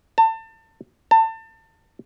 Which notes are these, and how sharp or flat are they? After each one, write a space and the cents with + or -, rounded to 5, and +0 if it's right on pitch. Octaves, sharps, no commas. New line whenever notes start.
A5 +30
A5 +30